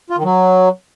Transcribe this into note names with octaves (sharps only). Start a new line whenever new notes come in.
F4
D#3
F#3